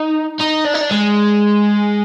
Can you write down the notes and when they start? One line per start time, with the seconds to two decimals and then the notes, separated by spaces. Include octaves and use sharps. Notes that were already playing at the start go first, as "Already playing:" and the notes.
Already playing: D#4
0.41 D#4
0.66 D4
0.74 D#4
0.81 D4
0.91 G#3